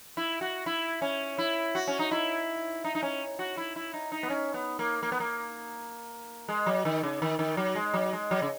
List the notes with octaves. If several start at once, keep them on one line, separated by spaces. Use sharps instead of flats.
E4
F#4
E4
C#4
E4
F#4
C#4
D#4
E4
D#4
D#4
C#4
F#4
E4
E4
D#4
D#4
B3
C#4
B3
A#3
A#3
B3
A#3
G#3
F#3
D#3
C#3
D#3
D#3
F#3
G#3
F#3
G#3
F#3
C#3